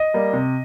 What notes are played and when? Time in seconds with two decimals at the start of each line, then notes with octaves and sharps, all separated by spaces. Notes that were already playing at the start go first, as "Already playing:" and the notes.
Already playing: D#5
0.14 G3 A#3
0.33 C3